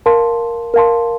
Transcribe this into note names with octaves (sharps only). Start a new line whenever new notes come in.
A#4 F5 A5 C6
A#4 F5 A5 C6